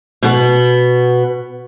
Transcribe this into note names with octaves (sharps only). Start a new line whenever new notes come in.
B2 B3